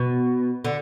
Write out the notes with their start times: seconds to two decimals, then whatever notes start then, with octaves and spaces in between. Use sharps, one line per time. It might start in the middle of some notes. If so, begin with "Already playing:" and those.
Already playing: B2
0.65 D3